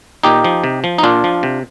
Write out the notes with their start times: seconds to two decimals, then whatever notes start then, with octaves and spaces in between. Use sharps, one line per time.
0.23 A#2 D#4 G4
0.44 F3
0.64 C3
0.84 F3
0.98 D#4
1.03 A#2 D4 F4
1.24 F3
1.43 C3